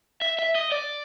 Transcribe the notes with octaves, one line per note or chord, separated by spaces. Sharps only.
E5
E5
D#5
D5